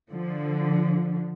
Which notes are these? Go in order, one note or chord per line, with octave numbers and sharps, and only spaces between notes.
D3 F3